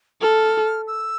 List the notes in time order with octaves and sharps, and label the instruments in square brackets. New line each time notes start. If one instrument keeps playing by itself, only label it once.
[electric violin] A4 [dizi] F6
[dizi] E6